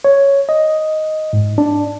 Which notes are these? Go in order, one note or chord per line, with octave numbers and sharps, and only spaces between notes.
C#5
D#5
G#2
D4